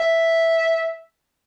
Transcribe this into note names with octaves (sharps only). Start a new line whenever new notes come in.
E5